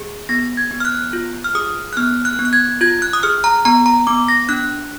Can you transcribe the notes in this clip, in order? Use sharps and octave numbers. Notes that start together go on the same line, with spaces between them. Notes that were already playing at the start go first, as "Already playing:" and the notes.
Already playing: G#4
B3 A#6
G#6
B3
F6
F#6
F4
F6
G#4 D#6
F#6
B3 F6
F#6
B3
F#6
G#6
F4 G#6
F#6
D#6
G#4 F6
A#5
B3 A#5
A#5
B3 D6
A#6
D4 F#6